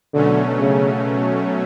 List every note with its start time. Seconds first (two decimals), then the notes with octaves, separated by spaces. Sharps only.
0.13 B2 D3 F#3 A3 C#4
0.59 C#3